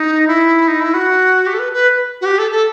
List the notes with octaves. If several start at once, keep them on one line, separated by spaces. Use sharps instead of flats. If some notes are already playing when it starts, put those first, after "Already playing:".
Already playing: D#4
E4
D#4
E4
F#4
G4
A4
B4
B4
F#4
G4
A4
A4